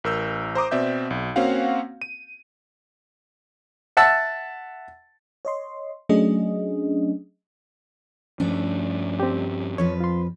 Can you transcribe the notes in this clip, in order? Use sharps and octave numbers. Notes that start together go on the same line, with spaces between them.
A1 A#4 E6 G6
C5 A#5 D6 D#6
B2 C4 D5 E5 G6
B1
A#3 C4 C#4 F#4 F5 F#5
D#7
E5 F#5 A5 E6
C#5 D#5 C6
F#3 A3 C#4 D4 G#4 D#5
G2 F3 A3 C#4 D4
C4 G4
F2 F3 B4 C#5
F4 C6